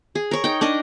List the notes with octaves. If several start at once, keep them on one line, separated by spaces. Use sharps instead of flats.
G#4
A#4 C#5
D#4 G5
D4 D#4 A#4 D#5